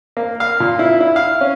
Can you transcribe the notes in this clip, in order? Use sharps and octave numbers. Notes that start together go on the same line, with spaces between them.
A#3
F5
A#2
E4
E4
F5
C#4